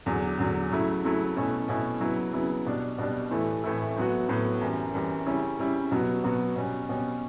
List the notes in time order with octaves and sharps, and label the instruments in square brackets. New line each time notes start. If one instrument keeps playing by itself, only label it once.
[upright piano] E2 D3 F#3
E2 D3 F#3
C#3 F#3 A3 E4
C#3 F#3 A3 E4
B2 A3 C#4 E4
B2 A3 C#4 E4
C#3 F#3 B3 E4
C#3 F#3 B3 E4
B2 G3 D4
B2 G3 D4
A2 E3 A3 E4
A2 E3 A3 E4
A2 F#3 B3 F#4
A2 F#3 B3 F#4
F#2 E3 G3
F#2 E3 G3
C#3 G3 C#4 E4
C#3 G3 C#4 E4
B2 F#3 B3 F#4
B2 F#3 B3 F#4
B2 G3 C#4
B2 G3 C#4